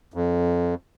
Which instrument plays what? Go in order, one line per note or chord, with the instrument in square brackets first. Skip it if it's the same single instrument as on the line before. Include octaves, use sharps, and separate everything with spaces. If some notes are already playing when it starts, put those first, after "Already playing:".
[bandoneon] F2